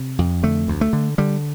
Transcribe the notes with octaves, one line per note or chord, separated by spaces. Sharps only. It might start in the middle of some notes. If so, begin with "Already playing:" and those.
Already playing: C3
F2
D3 A3
D2
A3
D3
D3 G3